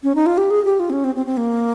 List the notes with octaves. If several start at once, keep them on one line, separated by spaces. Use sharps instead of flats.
C#4
D#4
F4
G4
G#4
G4
F4
C4
C#4
C4
C4
C4
A#3